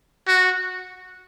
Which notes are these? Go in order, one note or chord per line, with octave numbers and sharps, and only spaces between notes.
F#4